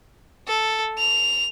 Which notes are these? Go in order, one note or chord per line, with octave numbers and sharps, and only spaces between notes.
A4
F7